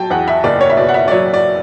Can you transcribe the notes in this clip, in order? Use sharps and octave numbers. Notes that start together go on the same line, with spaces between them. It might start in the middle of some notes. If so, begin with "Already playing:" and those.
Already playing: F#3 G5 A5
E2 F#5
E5
F#1 D5
C#5
E5
B2 D5
F#5
E5
D5
F#3 C#5
D5